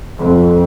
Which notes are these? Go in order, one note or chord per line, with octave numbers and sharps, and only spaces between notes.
F2